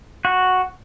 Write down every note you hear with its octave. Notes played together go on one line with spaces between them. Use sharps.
F#4